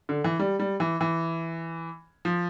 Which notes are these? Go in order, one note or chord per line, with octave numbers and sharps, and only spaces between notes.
D3
E3
G3
G3
E3
E3
F3